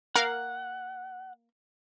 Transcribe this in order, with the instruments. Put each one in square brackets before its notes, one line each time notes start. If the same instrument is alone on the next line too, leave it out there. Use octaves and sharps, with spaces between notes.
[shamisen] A#3 [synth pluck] A#4 F5 [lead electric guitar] F#5